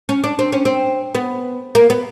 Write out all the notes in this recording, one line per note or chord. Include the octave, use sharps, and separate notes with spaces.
C#4
D4
C4
C#4
C4
B3
A#3
B3